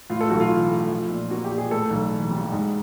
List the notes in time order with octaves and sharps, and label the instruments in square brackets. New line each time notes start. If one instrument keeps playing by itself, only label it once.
[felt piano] A2 [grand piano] F4
[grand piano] A4
[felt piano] B1 [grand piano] F#4
[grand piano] F4
[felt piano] E3
A3
F3
A#2
[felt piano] A#3 [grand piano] F#4
[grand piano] G4
[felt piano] A#2
[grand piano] G#4
[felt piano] A2 [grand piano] A4
[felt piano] B1
E3
G3
G#2